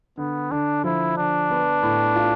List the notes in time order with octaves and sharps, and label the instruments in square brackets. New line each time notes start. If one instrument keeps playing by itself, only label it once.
[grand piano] D3 [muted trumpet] B3
[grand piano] D3 [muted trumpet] D4
[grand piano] F3 [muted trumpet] E4
[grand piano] D3 [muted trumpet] D4
[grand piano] B3
A2
F4